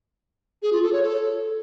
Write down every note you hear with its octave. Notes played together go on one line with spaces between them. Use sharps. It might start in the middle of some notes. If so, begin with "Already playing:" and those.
G#4
F4
A4
C#5
A4